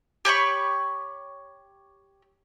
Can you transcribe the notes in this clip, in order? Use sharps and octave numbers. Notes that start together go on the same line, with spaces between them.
G4 C#5 B5 C#6